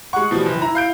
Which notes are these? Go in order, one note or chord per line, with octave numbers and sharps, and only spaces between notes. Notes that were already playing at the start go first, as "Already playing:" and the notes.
G#3 F#5 C#6
B2 E3 F3 G3
F#1
E4 A#5
F5 G6 D7